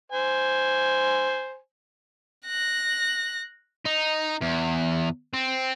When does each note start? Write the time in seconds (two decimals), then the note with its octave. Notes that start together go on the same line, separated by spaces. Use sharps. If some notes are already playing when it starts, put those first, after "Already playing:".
0.12 C5 G#5
2.46 F#6 A#6
3.86 D#4
4.42 E2
5.33 C4